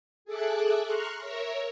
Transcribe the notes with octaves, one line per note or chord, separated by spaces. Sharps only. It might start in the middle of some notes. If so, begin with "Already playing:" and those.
G#4 A4 E5 D6 F#6
A#5 C6 C#6 F6 F#6
A#4 C#5 E5